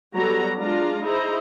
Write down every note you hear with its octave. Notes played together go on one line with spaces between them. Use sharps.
F#3 G3 B3 F#4 A4 A#5
G#3 D4 F4 F5 A#5
D#4 E4 G#4 C5 A#5